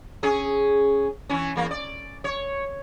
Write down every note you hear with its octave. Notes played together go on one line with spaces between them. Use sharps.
C#4 G#4
E3 C#4
E2 A#3
D5
C#5